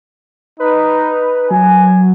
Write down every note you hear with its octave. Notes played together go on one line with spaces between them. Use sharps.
D#4 B4
F#3 G#5